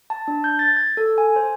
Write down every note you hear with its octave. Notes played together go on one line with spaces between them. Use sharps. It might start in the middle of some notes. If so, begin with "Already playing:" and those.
A5
D4
G6
A6
G#6
A4
G#5
C5